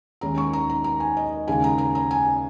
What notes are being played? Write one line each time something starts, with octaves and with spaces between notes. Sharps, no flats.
D#2 D#3 G#3 C#4 A#5
C#6
A#5
A#5
A#5
G#5
D#5
D#2 C#3 G#3 G#5
A#5
A#5
A#5
G#5